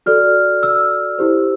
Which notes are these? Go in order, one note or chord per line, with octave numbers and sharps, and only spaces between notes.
F#4 A4 D5 F6
E6
E4 G4 C5